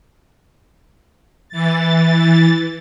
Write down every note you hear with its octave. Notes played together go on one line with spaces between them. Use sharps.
E3 A6